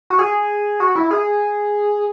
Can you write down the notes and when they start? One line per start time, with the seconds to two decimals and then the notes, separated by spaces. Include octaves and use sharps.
0.10 F#4
0.19 G#4
0.80 F#4
0.95 E4
1.11 G#4